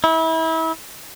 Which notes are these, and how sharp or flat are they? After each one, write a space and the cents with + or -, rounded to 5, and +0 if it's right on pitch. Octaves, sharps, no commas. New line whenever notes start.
E4 -30